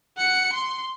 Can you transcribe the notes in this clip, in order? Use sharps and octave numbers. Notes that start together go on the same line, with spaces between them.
F#5 C#7
C6